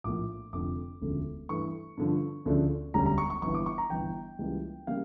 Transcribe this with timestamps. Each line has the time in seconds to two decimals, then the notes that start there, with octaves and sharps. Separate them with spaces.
0.04 A#1 A2 F3 A#3 D6
0.53 F1 F2 D3 A3 D6
1.01 E1 D2 C#3 F3 A3
1.49 G2 E3 A3 C#6
1.97 G2 D3 F3
2.46 D2 C#3 F3 A3 D4
2.94 E1 D2 D3 G3 C#4 A#5
3.06 A#5
3.18 C#6
3.30 C#6
3.42 G1 G2 E3 C#6
3.54 D6
3.66 C#6
3.78 A#5
3.90 G1 G2 E3 G5
4.39 C#2 C#3 E3 G3 A#3
4.87 C#3 G3 A#3 F5